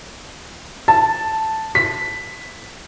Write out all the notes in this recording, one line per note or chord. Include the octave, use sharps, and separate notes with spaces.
A5
B6